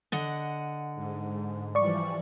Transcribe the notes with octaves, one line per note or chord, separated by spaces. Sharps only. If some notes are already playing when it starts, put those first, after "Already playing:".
D3 D#5 F#5
G#2
E3 F3 G3 D5 C#6